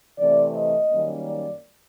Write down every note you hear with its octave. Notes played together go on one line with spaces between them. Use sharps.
C3 E3 A3 C4 D5
D#5
F#2 D#3 G3 A#3 C#4
D5